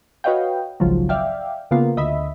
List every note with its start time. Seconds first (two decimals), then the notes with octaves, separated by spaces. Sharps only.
0.24 F#4 B4 C#5 D#5 F5 G5
0.80 G#1 C#2 F3 F#3
1.09 D5 E5 F5 G5
1.71 C#3 A#3 B3 F4
1.97 D2 D#5 E5 B5